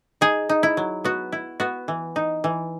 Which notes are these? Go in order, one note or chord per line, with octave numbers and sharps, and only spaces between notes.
D#4 G#4
D#4
E4
F#3
B3 F#4
E4
B3 F#4
E3
D#4
E3